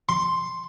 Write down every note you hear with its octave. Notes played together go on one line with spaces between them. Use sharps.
C6